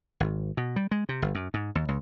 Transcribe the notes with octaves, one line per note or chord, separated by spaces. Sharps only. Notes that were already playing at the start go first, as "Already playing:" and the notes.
G#1
B2
G3
G#3
C3
G1
F#2
G#2
D#2
C#2